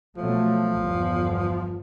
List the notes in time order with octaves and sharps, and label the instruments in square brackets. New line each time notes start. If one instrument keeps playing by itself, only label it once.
[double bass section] B2 F#3 A3 [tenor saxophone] F3
[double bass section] G1 E2